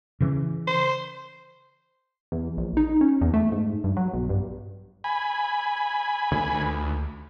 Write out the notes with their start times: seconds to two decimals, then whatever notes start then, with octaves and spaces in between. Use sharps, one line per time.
0.21 C#3 E3 C#4
0.67 C5
2.32 E2
2.57 A#1
2.77 D#4
3.01 C#4
3.21 E2
3.34 A3
3.52 G#2
3.84 G2
3.97 F#3
4.13 B1
4.29 G2
5.04 G#5 B5
6.31 D2